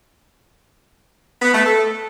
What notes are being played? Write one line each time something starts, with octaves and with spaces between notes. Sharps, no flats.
B3
A3
A4